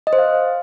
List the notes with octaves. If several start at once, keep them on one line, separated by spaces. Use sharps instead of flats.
D#5
C5
F5